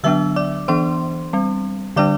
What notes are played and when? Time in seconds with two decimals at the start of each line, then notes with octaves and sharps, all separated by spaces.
0.04 D3 F#3 B3 D4 E5 E6
0.36 D5 D6
0.68 E3 B3 D4 C5 C6
1.33 G3 C4
1.96 D3 G3 D4 D5 D6